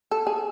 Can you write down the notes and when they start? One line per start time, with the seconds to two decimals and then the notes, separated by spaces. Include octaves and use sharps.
0.11 A4
0.27 G#4